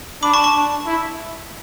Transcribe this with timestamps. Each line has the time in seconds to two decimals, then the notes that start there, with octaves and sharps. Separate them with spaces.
0.23 D4 B5 D6
0.33 A5 C#6
0.44 A5 C#6
0.54 D4
0.86 E4